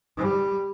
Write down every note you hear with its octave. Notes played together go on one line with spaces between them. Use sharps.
G3